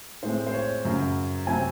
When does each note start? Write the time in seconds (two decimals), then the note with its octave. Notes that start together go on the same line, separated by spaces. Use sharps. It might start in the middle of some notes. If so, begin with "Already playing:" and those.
0.23 A2 G#3 C4 C5
0.47 C5
0.54 C#5
0.85 F#2 C#3 F#3
1.47 C3 F#3 C4 G#5